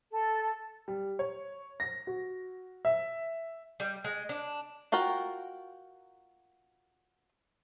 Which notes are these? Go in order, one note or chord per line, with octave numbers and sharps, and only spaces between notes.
A4
G3
C#5
A#6
F#4
E5
G3
G#3
D4
F4 F#4 A#4 G5